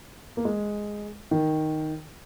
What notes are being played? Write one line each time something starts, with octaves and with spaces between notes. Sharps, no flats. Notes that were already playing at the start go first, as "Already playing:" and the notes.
A#3
G#3
D#3